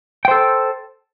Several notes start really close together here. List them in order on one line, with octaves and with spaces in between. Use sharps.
G5 C5 A4